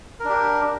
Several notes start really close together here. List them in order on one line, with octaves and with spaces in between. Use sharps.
A#4 D4 G4